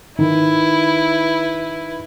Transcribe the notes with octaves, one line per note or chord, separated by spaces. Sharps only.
D#3 E4 B4